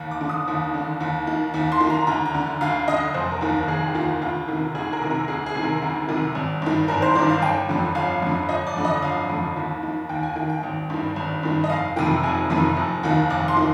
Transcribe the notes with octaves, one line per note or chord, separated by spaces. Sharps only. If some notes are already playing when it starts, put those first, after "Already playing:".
Already playing: D#2
D6
D3
D#6
D#2
D3
D#2
D#3
D#2
C6
D#3
A#5
D2 A#5
A#5
D3
D2 F5
D3 D#5
F1 C5
A#4
D#2 D#3
A#4
F1 G#4
G4
D#2 D#3 F4
D2 F4
C3 D#3
D2 G#4
A#4
C3 D#3
A#4
D2 G#4
G#4
C3 D#3
A#4
D2
C3 D#3
G#1
G2 D#3
G#1 A#4
C5
G2 D#3 D5
F5
G1 G5
F2 D3
G1 F5
F2 D3
G1 D#5
D5
F2 D3
D#5
G1 F5
F2 D3
D#2
D#3
D#2 G5
G#5
D#3 G5
G5
G#1
G2 D#3
G#1
G2 D#3
D#5
F1 F5
F2 C3 D#3 G5
F1 G#5
F2 C3 D#3
F1
D#2 D#3
F1 D6
C6
D#3